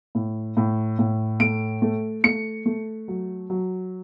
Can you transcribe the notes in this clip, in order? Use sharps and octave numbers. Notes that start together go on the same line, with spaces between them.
A2
A2
A2
A3 D7
A3
A3 C#7
A3
F#3
F#3